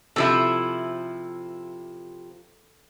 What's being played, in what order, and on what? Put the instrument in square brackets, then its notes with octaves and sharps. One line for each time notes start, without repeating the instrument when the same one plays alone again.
[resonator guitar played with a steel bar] C3 F3 E4 [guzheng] A4